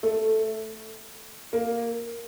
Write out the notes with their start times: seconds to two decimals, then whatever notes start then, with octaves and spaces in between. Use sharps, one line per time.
0.03 A3
1.53 A#3